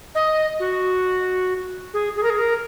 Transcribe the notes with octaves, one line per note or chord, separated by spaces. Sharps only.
D#5
F#4
G#4
G#4
A#4
G#4
A#4